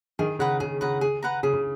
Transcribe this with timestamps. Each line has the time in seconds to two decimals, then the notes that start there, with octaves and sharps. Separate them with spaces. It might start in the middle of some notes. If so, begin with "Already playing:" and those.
0.19 D#3 G#4
0.39 C#3 B4 F#5 A#5
0.60 C#3 G#4
0.81 C#3 B4 F#5 A#5
1.01 G#4
1.22 B4 F#5 A#5
1.43 C#3 G#4
1.54 C#3